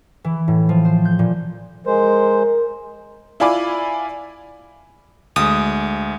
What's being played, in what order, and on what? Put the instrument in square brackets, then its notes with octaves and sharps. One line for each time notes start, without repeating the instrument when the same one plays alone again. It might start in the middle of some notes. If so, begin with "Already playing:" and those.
[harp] E3
A2
F3
C5
G6
A#2
[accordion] G#3 C5 [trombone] A#4
[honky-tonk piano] E4 F4 D5 G#5 B5 D6
[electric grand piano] D2 G#3 [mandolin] D#6